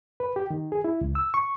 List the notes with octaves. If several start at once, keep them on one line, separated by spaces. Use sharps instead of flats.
B4
G4
D#3
G#4
E4
C#2
E6
C#6